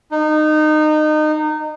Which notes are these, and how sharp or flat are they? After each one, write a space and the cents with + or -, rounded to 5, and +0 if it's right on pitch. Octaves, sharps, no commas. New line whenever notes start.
D#4 -25